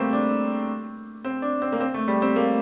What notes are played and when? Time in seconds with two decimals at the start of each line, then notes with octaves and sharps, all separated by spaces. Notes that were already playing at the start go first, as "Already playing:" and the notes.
Already playing: G3 A3 A#3 C4
0.13 D4
1.24 C4
1.42 D4
1.62 C4
1.72 A#3
1.80 C4
1.94 A3
2.08 G3
2.22 C4
2.36 A#3